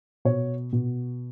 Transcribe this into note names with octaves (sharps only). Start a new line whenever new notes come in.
B2 C#5
B2